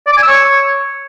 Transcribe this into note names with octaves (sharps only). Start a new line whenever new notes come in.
D5
D6
G#5
E6
C#5